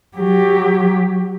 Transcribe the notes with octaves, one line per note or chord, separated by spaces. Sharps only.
F#3 G4